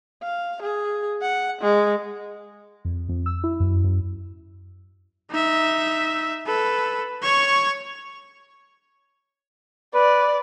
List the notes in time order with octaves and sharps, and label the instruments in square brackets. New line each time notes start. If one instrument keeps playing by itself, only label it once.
[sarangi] F5
G#4
F#5
G#3
[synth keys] F2
F2
E6
E4
F#2
F#2
[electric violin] D#4 E5
A4 B4
C#5 C#6
[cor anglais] B4 [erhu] D5